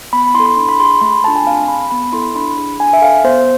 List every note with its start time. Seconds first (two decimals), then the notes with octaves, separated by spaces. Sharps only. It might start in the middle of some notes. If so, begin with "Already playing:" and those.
0.13 B3 B5
0.35 E4 C6
0.40 A4
0.46 C6
0.57 D4 B5
0.69 B5
0.79 G#4 C6
0.86 B5
0.91 C6
1.01 A3 B5
1.12 B5
1.24 D4 F4 A4 A5
1.35 G#5
1.46 C4 F5
1.68 G#4 B5
1.91 B3 B5
2.12 E4 A4 C6
2.35 D4 B5
2.58 G#4
2.80 D4 G#5
2.93 E5
3.02 A4 F5
3.24 B3 C5